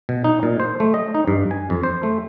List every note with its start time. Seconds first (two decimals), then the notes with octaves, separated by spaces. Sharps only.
0.09 B2
0.24 D#4
0.43 A#2
0.60 C5
0.80 A3
0.94 D#5
1.14 D#4
1.28 G2
1.51 G#5
1.70 F2
1.83 C5
2.03 A3